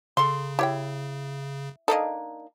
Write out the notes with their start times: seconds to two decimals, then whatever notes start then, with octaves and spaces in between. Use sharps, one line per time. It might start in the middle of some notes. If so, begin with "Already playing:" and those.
0.17 C#3 A4 C6
0.59 E4 G4 C#5 G5
1.88 A#3 D4 D#4 A4 D#5